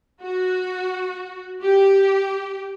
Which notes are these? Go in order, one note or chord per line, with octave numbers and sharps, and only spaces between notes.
F#4
G4